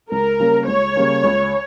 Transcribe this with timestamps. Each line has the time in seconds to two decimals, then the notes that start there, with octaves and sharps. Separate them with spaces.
0.11 C#2 A#4
0.40 C#3 G3 A#3 C#4
0.68 C#2 C#5
0.96 C#3 G3 A#3 C#4
1.24 C#2